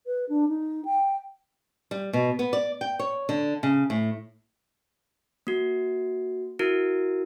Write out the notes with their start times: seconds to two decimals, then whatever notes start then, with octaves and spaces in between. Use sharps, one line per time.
0.06 B4
0.29 D4
0.49 D#4
0.85 G5
1.91 G3
2.13 B2
2.39 B3
2.53 D5
2.81 G5
2.99 C#5
3.29 D3
3.63 C#3
3.90 A2
5.47 A#3 F#4
6.59 E4 F#4 A#4